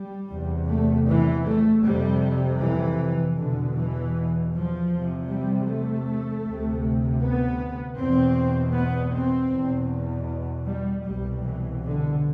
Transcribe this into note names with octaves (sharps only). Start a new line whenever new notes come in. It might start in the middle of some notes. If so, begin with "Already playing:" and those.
Already playing: G3
E2 C3
A3
E3
A3
F2 C3 G3
E3
E2 B2 D3
E3
F3
E2 C3
G3
A3
D2 C3
B3
E2 B2 C4
B3
C4
E2
B2
G3
C2 B2 G3
E3
D3